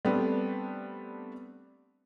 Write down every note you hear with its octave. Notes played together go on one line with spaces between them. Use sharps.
G3 A3 B3 C4 D4